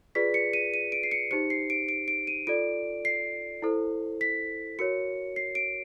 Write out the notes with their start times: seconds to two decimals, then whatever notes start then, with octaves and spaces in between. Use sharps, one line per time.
0.15 F4 G#4 B4 D5 B6
0.34 C#7
0.53 D#7
0.74 D#7
0.92 D7
1.03 C7
1.11 C#7
1.31 D#4 G4 C5 C#7
1.50 C7
1.70 D7
1.89 D7
2.08 D7
2.27 D#7
2.47 F4 A4 D5 D7
3.05 C7
3.62 E4 A4 C5
4.21 B6
4.79 F#4 A#4 C#5 C#7
5.36 C7
5.55 D7